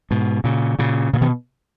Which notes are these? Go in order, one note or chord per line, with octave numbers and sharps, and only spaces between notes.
G#2 B2
A#2 C#3
A#2 C#3
A#2 C#3
B2 D#3